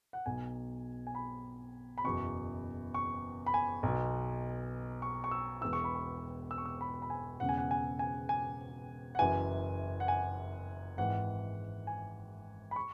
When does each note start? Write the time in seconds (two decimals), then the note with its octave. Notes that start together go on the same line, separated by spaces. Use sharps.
0.13 F#5
0.26 B1 B2 G#5
1.07 G#5
1.15 B5
1.98 B5
2.04 F#1 E2 B2 C#6
2.94 C#6
3.46 B5
3.54 G#5
3.83 B1 B2
5.02 C#6
5.24 C#6
5.31 E6
5.61 E1 E2 E3 E6
5.73 C#6
5.84 B5
5.95 C#6
6.51 E6
6.58 C#6
6.66 E6
6.81 B5
7.02 B5
7.10 G#5
7.40 E1 E2 C#3 F#5
7.49 G#5
7.58 F#5
7.71 G#5
7.99 G#5
8.29 G#5
9.15 F#5
9.19 F#1 F#2 E3 G#5
10.00 F#5
10.08 G#5
10.97 G#1 G#2 E3 F#5
11.87 G#5
12.71 B5
12.76 C#6